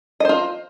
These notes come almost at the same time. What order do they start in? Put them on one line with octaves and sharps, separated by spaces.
D#5 C5 F4